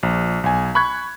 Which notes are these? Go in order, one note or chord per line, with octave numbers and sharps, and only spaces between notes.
A#1
B1 G#5
B5 C#6 F#6 G#6